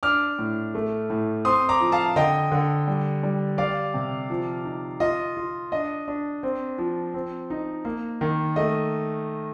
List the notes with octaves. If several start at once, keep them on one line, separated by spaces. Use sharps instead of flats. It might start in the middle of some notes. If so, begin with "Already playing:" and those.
D4 D6 F6
A2
A3
A2
C4 C6 D#6
A#5 D6
F3
F5 A5
D3 D#5 G5
D3
G3
G3
G3 D5 F5
C3
F3
D#4
F4 D#5
F4
D4 D#5
D4
C4
F3
C4
D#4
A#3
D#3
A3 D#5